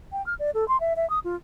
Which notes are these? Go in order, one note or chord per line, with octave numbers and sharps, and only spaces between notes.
G5
F6
D5
A4
C6
E5
E5
D#6
F4